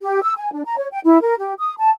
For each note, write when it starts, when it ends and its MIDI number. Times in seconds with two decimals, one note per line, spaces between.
0.01 0.22 67
0.22 0.33 88
0.36 0.51 80
0.52 0.63 62
0.65 0.78 82
0.78 0.87 73
0.91 0.99 79
1.04 1.21 64
1.22 1.35 70
1.39 1.53 67
1.58 1.73 87
1.78 1.90 81